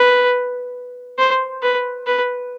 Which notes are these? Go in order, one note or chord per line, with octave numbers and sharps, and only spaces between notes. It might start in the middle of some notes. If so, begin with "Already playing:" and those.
Already playing: B4
C5
B4
B4